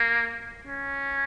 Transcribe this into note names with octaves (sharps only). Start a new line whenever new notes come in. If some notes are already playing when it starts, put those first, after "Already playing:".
Already playing: A#3
C#4